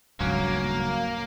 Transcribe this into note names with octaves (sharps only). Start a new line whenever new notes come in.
D#1 C#2 G2 F#3 A#3 C#4